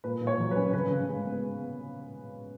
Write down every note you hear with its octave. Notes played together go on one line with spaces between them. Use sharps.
A#2 B4
A#2
C#5
F#3
B4
C#4
C#3 B4
C#3
G#3
B3